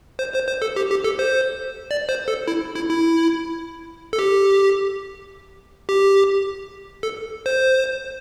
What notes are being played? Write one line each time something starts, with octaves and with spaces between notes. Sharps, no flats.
C5
C5
C5
A4
G4
G4
A4
C5
D5
C5
A4
E4
E4
E4
A4
G4
G4
A4
C5